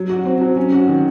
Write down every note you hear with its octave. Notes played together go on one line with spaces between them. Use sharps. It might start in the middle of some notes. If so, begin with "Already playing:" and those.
Already playing: F#3
F#4
C4
F#3
C#4
F#4
D#3